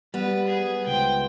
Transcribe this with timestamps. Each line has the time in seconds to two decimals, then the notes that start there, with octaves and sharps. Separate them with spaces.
0.14 G3 B3 B4
0.47 G#4
0.87 C#2 C5 G5